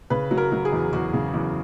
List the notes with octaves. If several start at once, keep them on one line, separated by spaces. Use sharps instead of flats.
C#3 B4
F#3
A#4
F#3
G#4
E2
E2 F#4
C#3
E2